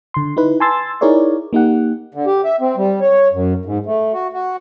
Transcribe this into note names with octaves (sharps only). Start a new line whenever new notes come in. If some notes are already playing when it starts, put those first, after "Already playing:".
D3 C6
D#4 E4 B4
G#5 A5 C6 E6 A6
D#4 E4 G#4 A#4 C#5 D5
A#3 D#4 G4 F#5
D3
G4
E5
C4
G3
C#5
F#2
G#2
A3
F#4
F#4